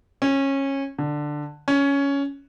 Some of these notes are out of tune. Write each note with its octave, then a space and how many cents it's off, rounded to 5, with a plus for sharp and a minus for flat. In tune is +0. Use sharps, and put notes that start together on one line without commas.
C#4 -20
D3 +10
C#4 +10